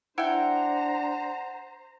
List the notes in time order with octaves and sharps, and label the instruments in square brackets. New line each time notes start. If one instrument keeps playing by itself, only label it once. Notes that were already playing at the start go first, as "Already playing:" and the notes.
[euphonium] D4 [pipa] E4 G5 [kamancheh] C5 A#5 [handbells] F#5